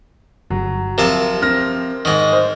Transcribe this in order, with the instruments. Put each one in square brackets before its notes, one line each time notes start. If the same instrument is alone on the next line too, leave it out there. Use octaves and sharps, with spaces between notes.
[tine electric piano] G1 [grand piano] F#3
[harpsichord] C3 F3 A5 [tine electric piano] A#4 [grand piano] E7
[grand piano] C4 F6 A#6
[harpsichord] G#2 D#3 [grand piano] F#7
[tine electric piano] C5